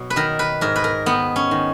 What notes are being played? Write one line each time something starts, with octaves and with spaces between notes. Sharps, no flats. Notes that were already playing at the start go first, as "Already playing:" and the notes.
Already playing: B2 F#3
B4
D#3 A#4
B4
G#2 A#4
B4
A#4
D#3 B3
C#4
D#3